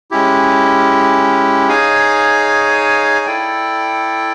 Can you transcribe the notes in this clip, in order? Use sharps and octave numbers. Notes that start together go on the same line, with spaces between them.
G#3 C#4 E4 G4
D#4 G#4 C#5 F5 G#5
E4 A4 D5 G5